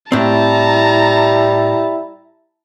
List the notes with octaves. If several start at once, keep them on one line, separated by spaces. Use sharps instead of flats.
A2 G3 C4 E4 A5 A#5